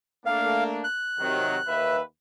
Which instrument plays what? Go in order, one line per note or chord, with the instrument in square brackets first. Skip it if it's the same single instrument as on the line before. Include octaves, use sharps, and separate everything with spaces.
[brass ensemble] A3 A#3 D4 [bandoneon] F5
[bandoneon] F#6
[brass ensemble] C3 D#3 F#3
D#2 B4 E5